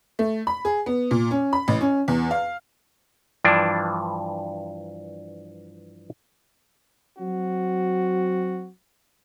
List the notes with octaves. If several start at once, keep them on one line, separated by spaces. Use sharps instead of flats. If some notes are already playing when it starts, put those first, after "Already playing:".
A3
B5
G#4
B3
A#2
C#4
B5
A1
C#4
E2
F5
G2 E3 F3 D4
F#3 C4 F#4